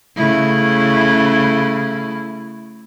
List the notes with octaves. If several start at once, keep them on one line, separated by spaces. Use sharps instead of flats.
C#3 A3 E4